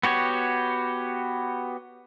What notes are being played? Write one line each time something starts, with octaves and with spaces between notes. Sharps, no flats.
B3 F#4 G4 C#5